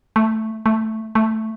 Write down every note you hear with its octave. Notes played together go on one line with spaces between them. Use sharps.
A3
A3
A3